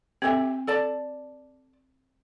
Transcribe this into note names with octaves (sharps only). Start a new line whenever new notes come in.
C4 G4 A4 E5
A4 D5 A5